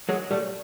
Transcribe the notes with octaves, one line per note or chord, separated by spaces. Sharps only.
F#3 G#3
G3 A3